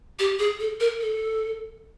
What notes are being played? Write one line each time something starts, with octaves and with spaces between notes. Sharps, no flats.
G4
G#4
A4
A#4
A4